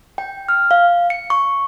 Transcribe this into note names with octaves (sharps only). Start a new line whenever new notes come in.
G5
F6
F5
C#7
C#6